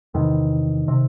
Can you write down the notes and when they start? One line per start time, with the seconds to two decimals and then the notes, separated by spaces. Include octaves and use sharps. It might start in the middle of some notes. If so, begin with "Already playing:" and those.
0.14 E2 C3 D#3
0.88 C3